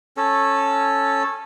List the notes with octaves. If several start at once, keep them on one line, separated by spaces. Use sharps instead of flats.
C#4 A4